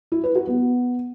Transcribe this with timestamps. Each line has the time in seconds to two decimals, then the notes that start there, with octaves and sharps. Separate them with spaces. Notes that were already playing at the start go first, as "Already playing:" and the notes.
0.12 E4
0.24 B4
0.35 F#4
0.47 B3